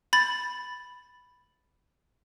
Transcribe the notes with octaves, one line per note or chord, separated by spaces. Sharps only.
B5 A6